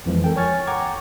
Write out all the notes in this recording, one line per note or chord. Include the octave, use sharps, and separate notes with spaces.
F2 E3 F3 G#3
A4 A#4 G5
C#5 G#5 C#6 F6 G#6 A6
F#5 G5 A#5 C#6 D6 G#6